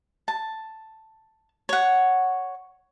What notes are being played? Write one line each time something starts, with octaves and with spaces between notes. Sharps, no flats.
A5
C#5 F#5